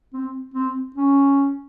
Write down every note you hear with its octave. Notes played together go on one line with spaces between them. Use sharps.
C4
C4
C#4